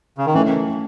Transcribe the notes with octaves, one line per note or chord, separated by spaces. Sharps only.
C#3
D#3
E3 A3 C#4 E4